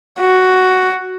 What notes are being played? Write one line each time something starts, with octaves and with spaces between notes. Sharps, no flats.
F#4